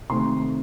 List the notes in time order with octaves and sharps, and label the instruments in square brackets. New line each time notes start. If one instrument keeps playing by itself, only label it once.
[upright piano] C3 D#3 A3 C4 C6